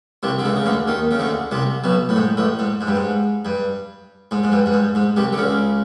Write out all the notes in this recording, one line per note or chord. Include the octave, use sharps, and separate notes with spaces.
C2 C3
D3
C#2 C#3
C#3
D2 D3
D#2 D#3
C#3
D2 D3
C2 C3
B1 B2
A2
G#2
A1 A2
G#2
G#2
G2
G#2
G2
G#2
G#2
G2
G2
G#2
G#2
C2 C3
D3
C#2 C#3